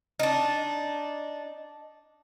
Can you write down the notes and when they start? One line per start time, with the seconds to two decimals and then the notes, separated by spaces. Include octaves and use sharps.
0.19 D4 D#4